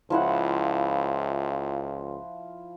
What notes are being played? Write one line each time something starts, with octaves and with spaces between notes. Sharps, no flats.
C#2 F3 E4 F#5